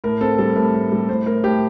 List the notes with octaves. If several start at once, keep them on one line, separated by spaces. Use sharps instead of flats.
A2 A#4
C4 A4
G3 A4
A2 A#4
A2
G3
A2 C5
A2 A#4
A2 G4